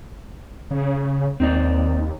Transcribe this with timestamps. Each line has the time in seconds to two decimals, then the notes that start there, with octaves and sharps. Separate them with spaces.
0.71 C#3
1.40 D#2 C4 D#4 D5